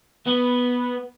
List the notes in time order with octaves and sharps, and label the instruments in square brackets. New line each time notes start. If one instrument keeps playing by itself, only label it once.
[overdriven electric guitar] B3